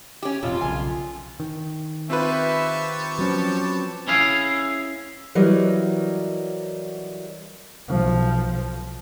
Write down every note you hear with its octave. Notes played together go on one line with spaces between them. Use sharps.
C#4 G4
E1 F2 B2 C4 F4
B1 C#3 G#5
D#3
C4 F4 G4 B4 E5 A5 C#6
F3 F#3 C#4
C#4 E4 G#4 F5
E3 F#3 G3 A#4 D#5
B1 F3